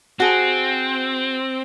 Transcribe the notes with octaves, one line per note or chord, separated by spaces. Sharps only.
C4 F#4 G#4